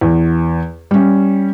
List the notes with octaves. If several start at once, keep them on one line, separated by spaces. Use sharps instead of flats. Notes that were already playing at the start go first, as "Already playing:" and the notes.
E2
G3 C#4